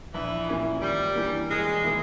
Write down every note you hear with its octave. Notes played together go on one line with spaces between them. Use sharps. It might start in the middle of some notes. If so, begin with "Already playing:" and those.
A#1 E3
A#2 A#3 C#4 E4
G#1 G3
G2 E3 A#3
E1 G#3
D#3 A#3 E4